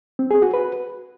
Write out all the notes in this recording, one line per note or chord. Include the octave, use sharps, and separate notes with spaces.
C4
G#4
F#4
B4